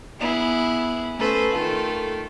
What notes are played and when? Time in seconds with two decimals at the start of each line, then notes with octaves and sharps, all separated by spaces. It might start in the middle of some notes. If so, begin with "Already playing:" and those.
0.19 B3 E4 G#4
1.17 A3 C#4 A4 B4 C5
1.51 D#3 A3 F4 A4